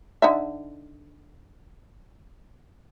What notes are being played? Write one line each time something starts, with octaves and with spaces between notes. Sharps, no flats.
D3 D#4 E5